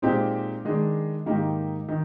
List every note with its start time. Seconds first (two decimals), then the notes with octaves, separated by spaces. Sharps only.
0.02 A#2 G#3 C4 D#4 G4
0.65 D#3 G#3 D4
1.26 G#2 D#3 A#3 D#4 G4
1.89 D#3